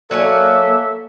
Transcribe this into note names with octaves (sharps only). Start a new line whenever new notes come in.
F#3 A#3 A4 C#5 E5 G#5